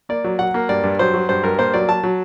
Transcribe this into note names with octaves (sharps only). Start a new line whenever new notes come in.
A#3 D5
F#3
F#3 F#5
A#3
G2 D5
G2
F#3 C5
F#3
G2 C5
G2 A#4
A#3 C5
F#3 D5
F#3 A5
F#3